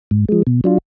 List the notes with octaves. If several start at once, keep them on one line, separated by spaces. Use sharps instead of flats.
G#2
F3 G#3
B2
F#3 D4 F4